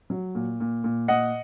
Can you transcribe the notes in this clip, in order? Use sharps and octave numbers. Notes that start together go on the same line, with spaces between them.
F#3
A#2
A#2
A#2
A#2 D#5 F#5